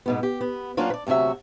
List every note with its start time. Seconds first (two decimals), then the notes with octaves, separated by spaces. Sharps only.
0.06 G#2 B2 B3
0.23 G4
0.41 B3
0.77 F#3 A#3 C#4 D4 F4
0.90 B4 D5
1.07 D2 C3 F#3 F#4 E5